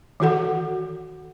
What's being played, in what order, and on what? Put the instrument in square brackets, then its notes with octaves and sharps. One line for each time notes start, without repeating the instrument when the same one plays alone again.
[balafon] D#3 E3 F#4 A4 F#5